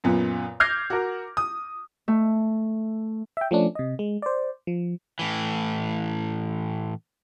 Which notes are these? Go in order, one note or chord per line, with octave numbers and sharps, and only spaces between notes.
F#2 A#2 B3
D6 F6 G6 G#6 A#6 C7
F#4 A#4
D#6
A3
E5 G5
F3 A3 C#4 D4
C3 D#5
G#3
C5 D5
F3
A2 E3